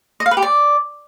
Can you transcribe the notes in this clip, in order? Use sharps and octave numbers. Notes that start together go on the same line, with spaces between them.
D#5
F5
B4
G4
D5